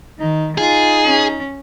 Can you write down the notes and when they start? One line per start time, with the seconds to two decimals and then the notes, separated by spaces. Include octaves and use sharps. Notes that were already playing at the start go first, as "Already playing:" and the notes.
0.20 D#3 D#4
0.58 D#4 F4 G#4
1.05 C#4